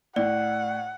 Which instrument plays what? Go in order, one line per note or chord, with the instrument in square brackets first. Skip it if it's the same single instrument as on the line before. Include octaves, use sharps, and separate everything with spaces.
[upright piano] A2 [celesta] D5 [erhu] F#5